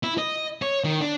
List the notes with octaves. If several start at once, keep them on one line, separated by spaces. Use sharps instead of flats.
E4
D#5
C#5
D#3
D4